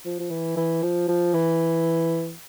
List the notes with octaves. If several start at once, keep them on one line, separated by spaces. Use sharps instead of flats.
F3
F3
E3
E3
F3
F3
E3